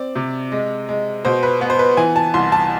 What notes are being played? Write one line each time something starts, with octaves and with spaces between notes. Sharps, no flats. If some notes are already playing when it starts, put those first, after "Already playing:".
Already playing: C4 D5
C3
G#3
G#3
B2 C5
B4
B3
C5
B4
E3 G#5
A5
C2 C6
A5